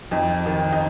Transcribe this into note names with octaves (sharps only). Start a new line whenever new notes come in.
F2 D#4
D#3
D#4